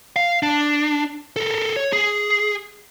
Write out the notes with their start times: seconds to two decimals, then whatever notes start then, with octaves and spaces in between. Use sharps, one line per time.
0.16 F5
0.43 D4
1.36 A4 A#4
1.76 C#5
1.93 G#4